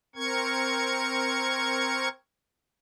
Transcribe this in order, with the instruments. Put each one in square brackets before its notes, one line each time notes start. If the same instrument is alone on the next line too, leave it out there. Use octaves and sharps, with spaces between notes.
[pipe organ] C4 A#4 C#6 G#6